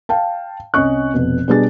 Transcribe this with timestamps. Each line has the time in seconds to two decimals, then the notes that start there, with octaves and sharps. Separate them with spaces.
0.09 F5 G5 A5
0.74 C2 C#4 D#5 C#6 F#6
1.14 F1 B2
1.48 B2 G3 D4 G#4 A6